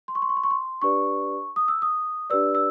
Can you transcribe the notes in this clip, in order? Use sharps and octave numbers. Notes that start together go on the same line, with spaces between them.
C6
C#6
C6
C#6
C6
C#6
C6
D4 G4 B4 D5 C#6
D#6
E6
D#6
D4 G4 B4 D5 E6
E6